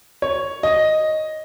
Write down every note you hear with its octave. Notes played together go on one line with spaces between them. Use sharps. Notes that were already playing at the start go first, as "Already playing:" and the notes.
C#5
D#5